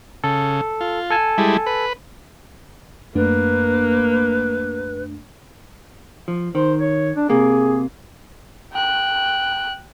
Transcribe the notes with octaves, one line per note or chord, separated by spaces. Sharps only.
C#3 A4
F4
A4 G#5 A5
G3 G#3 E4
B4
F#2 A3 A#3 D4 B4
F3
D#3 C5
C#5
D4
C3 A#3 G#4
G5 F#6